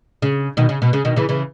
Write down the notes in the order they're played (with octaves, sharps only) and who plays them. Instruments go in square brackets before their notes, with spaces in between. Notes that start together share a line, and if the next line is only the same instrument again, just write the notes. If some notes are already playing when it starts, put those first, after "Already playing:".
[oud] C#3
B2 D#3
C#3
B2
C#3
B2 D#3
C#3 E3
C#3 E3